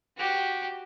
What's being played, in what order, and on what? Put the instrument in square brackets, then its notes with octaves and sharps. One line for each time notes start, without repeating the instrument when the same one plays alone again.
[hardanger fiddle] F#4 G4